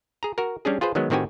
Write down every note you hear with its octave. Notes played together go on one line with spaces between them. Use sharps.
G#4 A#5
F#4 A#4
G3 C#4 D4 G#4
F4 G#4 B4 C5
D#3 F#3 G#3 B3
A2 D#3 C4 F#4 G4 G#5